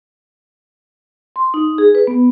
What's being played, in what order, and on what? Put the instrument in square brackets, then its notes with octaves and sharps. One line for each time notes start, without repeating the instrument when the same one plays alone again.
[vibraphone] C6
D#4
G#4
B4
B3